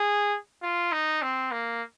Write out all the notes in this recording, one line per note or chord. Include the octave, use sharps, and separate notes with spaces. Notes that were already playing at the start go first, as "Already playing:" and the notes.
Already playing: G#4
F4
D#4
C4
A#3